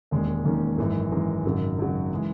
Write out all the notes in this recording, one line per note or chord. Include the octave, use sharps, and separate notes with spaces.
E1 D#2 D#3 G#3 C#4
E1 D#2 D#3 G#3 C#4
G#1 F#2 E3 G#3
G#1 F#2 E3 G#3
G#1 F#2 C#3 F#3
G#1 F#2 C#3 F#3
C#3 E3 G#3